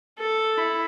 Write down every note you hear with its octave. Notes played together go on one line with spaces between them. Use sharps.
A4
E4